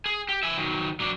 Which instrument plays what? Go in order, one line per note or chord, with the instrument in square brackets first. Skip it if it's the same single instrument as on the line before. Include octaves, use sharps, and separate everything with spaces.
[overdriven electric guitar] G#4
G4
E5 G#5
D#3 F#3
F#3 D4